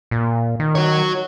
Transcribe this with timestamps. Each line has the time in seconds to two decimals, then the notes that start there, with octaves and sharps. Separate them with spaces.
0.11 A#2
0.60 D#3
0.75 F#4 C#5